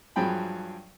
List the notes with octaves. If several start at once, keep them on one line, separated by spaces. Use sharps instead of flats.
G2 F3 F#3 G#4 G5 B5